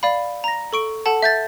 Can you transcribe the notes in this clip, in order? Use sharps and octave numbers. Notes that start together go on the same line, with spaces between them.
D5 F5 B5
A#5 A#6
A4 C#6 D7
A4 F#5 A5
E5 G6 A6